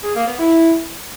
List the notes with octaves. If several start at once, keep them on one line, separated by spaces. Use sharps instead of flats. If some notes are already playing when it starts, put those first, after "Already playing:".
G#4
A#3
B3
E4